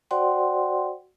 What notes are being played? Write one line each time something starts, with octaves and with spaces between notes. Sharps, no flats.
F#4 C5 D5 F#5 G5 C6